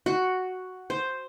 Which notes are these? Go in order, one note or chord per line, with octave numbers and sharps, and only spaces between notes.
F#4
C5